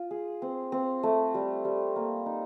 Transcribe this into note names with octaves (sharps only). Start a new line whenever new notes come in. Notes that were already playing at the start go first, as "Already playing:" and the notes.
Already playing: F4
G#4
C4
C4
A3
G3
G3
A#3
D#4